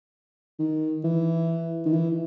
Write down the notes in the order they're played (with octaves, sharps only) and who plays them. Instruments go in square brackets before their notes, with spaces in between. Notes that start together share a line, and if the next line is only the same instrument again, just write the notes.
[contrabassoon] D#3
E3
D#3
E3